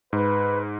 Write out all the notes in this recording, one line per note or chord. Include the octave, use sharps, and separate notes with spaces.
G#2 B4